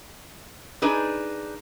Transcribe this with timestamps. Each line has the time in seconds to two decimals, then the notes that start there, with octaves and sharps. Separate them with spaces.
0.82 D4 D#4 G#4 B4